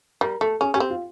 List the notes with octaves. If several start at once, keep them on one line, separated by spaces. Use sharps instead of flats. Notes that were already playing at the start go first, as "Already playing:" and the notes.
G3 A#4
A3 A4
C#4 G#4
C#4 G4
C4
F4